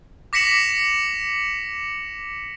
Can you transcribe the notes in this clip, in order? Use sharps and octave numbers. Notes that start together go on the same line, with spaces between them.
D6 A#6 B6 C#7 E7 F#7